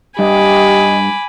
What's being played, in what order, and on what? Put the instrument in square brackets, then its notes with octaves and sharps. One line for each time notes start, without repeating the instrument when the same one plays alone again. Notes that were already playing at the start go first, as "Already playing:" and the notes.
[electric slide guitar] G2 [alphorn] G4 [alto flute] D#5 [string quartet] G#5 B5 D6